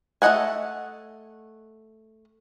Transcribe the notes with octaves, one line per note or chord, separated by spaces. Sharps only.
A3 F#4 D#5 F#5 G#5